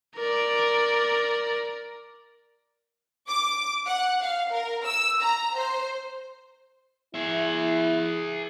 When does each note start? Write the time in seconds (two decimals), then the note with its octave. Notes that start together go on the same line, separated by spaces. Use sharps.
0.16 A#4 D5
3.28 D6
3.86 F#5
4.22 F5
4.53 A#4
4.85 E6
5.21 A#5
5.57 C5
7.14 E4 G#4 E5